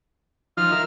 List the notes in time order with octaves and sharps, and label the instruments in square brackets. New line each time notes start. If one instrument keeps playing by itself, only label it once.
[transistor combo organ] F3 D#4 F4 [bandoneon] F6
[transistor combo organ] A#4 E5 F5